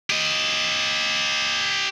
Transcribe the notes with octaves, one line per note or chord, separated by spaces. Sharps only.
G4 D#5